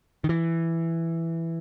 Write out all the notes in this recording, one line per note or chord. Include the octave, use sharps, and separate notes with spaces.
D#3
E3